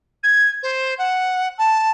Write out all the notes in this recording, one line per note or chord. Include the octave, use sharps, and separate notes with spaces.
G#6
C5
F#5
A5